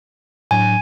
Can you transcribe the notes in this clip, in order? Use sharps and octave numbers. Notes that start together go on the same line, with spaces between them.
A2 F#3 D4 G#5